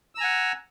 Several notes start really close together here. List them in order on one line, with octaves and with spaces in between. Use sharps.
E6 A#5 G#5 F#5